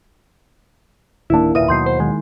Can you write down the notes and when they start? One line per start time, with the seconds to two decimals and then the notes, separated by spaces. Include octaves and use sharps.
1.30 D1 D#3 A#3 D4 E4
1.55 E1 A#2 E4 B4 E5 D#6 D#7
1.68 D#2 B2 F#3 C6 G6 C7
1.86 C5
2.00 D#3 G#3